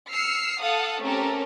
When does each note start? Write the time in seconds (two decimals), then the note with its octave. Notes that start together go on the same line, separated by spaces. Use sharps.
0.11 E6 F6 C7 C#7
0.60 A4 F5 F#5 D#6
1.00 A3 C4 C#4 G4 A4 A#4